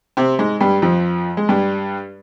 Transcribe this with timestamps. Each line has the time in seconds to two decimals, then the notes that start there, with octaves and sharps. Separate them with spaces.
0.17 C3 C4
0.39 G#2 G#3
0.60 G2 G3
0.82 F2 F3
1.37 G#3
1.49 G2 G3